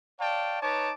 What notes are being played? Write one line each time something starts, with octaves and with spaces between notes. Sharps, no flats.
C#5 D5 F5 G5 A5
D#4 B4 C#5 A5 D6